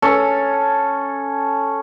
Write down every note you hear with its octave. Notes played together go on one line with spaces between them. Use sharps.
C#4 A4